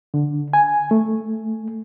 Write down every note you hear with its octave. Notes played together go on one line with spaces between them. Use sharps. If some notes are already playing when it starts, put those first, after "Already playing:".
D3
G#5
A3